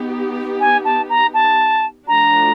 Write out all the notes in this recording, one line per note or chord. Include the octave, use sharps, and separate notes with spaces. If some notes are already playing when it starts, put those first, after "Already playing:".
Already playing: B3 D#4 G4
G#5
A5
A#5
A5
F3 A3 D4 F#4 A#5